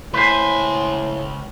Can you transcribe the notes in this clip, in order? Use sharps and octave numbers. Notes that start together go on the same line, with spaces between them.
C#2 A2 B4 C5 G#5